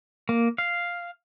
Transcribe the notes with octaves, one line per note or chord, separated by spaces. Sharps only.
A#3
F5